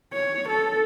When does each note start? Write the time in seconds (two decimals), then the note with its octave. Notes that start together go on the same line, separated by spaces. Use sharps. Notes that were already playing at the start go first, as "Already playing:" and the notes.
0.13 C#5
0.49 A4